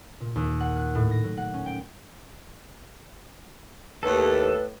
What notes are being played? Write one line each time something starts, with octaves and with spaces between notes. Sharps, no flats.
A#2
D#2
F#5
F#6
A2
A#6
F#3
F#5
C#4
G5
D#2 A2 A4 B4